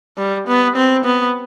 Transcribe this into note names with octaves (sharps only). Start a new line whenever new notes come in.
G3
B3
C4
B3